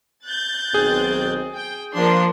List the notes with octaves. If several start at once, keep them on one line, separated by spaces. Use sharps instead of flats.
F#6 G6 A6
B1 D#3 C4 G#4
G5
F3 A#3 D4 C6